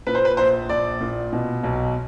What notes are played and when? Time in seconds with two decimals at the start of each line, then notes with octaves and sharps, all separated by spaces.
0.07 A#2 B4
0.15 C5
0.25 B4
0.37 A#1 C5
0.69 A#1 D5
1.01 A#2
1.33 B2
1.63 B1